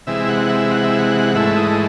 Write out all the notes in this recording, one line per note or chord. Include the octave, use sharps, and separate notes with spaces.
C3 E3 G#3 E5
F#5
E5
F#5
E5
F#5
G#2 E3 A3 E5
D#5